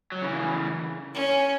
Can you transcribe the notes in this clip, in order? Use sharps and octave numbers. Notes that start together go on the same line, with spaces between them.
F#3
C#3 E3
C#4